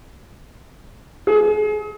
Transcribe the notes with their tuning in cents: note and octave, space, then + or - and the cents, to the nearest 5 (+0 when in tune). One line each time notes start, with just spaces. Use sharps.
G#4 +30